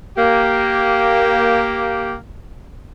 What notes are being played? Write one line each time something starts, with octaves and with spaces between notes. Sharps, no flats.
A#3 G4